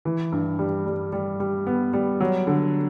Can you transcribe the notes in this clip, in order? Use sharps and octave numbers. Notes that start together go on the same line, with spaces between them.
E3
G2
G3
G3
G3
G3
B3
G3
F#3
D3